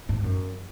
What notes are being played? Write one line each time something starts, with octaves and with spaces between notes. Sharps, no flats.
G#2
F#2